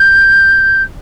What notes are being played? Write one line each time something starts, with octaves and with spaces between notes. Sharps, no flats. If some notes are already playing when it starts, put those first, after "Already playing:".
Already playing: G6